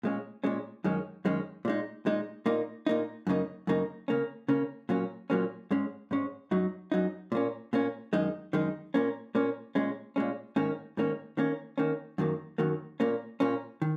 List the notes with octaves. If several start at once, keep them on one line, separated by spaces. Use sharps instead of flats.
A#2 G#3 C#4
A#2 G#3 C#4
F#2 D#3 G#3 C#4
F#2 D#3 G#3 C#4
A#2 G#3 D#4
A#2 G#3 D#4
A#2 A#3 D#4
A#2 A#3 D#4
F#2 C#3 A#3 D#4
F#2 C#3 A#3 D#4
C#3 A#3 C#4
C#3 A#3 C#4
A#2 F#3 A#3 C#4
A#2 F#3 A#3 C#4
G#2 G#3 C#4
G#2 G#3 C#4
F#2 F#3 D#4
F#2 F#3 D#4
A#2 A#3 C#4
A#2 A#3 C#4
F#2 D#3 G#3 D#4
F#2 D#3 G#3 D#4
A#2 A#3 C#4
A#2 A#3 C#4
A#2 G#3 C#4
A#2 G#3 C#4
G#2 D#3 A#3 C#4
G#2 D#3 A#3 C#4
D#3 A#3 C#4
D#3 A#3 C#4
F#2 D#3 F#3 A#3
F#2 D#3 F#3 A#3
A#2 A#3 C#4
A#2 A#3 C#4
D#3